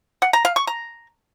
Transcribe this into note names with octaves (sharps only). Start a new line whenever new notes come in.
F#5
A#5
F5
C#6
A#5